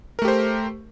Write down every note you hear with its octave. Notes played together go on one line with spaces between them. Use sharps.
A3 G4 A#4 C5